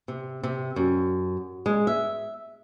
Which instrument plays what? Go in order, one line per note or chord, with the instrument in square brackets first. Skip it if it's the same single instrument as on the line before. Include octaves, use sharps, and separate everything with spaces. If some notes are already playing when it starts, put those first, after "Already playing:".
[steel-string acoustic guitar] C3
C3
F#2
G#3
E5